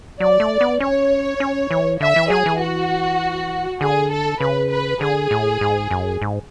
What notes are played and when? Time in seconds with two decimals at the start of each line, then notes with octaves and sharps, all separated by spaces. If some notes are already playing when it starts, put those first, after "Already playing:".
0.20 F#3 D5
0.40 A3
0.61 B3
0.80 C#4 C#5
1.40 C#4
1.71 E3
2.01 D3 E5
2.16 E3
2.30 F#3 G#4
2.46 E3
2.60 F#4
3.81 D3 G#4
4.11 A4
4.40 C#3 B4
4.70 B4
5.01 D3 G#4
5.31 A2
5.61 G#2
5.91 F#2
6.22 G#2